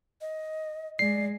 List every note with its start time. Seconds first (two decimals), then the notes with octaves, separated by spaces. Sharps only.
0.21 D#5
0.99 G#3 D5 C7